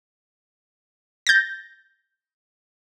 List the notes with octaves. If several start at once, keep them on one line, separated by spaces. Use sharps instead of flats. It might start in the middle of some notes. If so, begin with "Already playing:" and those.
G6 A6 A#6